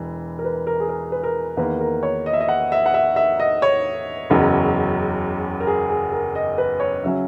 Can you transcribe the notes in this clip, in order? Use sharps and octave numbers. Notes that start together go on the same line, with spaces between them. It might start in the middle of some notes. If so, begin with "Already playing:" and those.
Already playing: E1 E3
A#4
B4
A#4
G#4
A#4
B4
A#4
E2 D#3 A#3 B4
A#4
C#5
D#5
E5
D#5
F#5
E5
F#5
E5
E5
D#5
C#5
F#1 E2 C#3 F#3
A#4
G#4
G#4
A#4
D#5
B4
C#5
C#3 F#3 C#4 E5